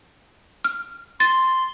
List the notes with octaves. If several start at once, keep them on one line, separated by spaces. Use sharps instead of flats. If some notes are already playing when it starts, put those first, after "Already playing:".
F6
C6 A6